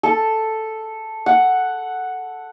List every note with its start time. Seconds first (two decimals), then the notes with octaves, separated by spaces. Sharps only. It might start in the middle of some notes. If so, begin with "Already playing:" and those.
0.03 A4
1.26 F#5